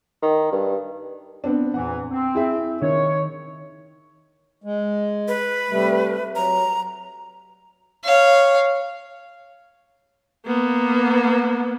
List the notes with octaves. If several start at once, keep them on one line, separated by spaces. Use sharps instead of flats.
D#3
G2
B3 C4 D4
E2 A#2 E3 F#5
C4
E4 G#4 E5
D#3 C#5
G#3
B4
C3 G3 A3
F#3 A#5
C#5 F5
A#3 B3